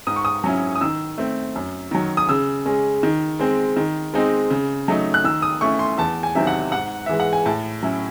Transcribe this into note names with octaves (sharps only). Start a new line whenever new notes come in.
G#2 D#6
C#6
D#6
F#3 C#4 E4
D#6
D#3 E6
A3 C4
F#2
D#3 F#3
D#6
C#3 E6
G#3 C#4
D#3
G#3 C4
D#3
G#3 C4 D#4
C#3
F#3 A3 D#4
F#6
D#3 E6
D#6
A3 C#4 E4 C#6
C6
E2 A5
G#5
C3 D#3 F#3 C4 E5
F#5
G#2 F#5
E3 G#3 E5
F#5
G#5
A2 A5
F#3 C#4 E4